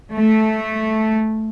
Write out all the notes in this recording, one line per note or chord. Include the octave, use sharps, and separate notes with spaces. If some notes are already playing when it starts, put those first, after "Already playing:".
A3